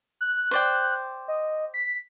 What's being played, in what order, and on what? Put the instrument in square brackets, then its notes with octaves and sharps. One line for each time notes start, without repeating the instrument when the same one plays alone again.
[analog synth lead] F#6
[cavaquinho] C5 D5 G5
[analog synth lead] D#5
B6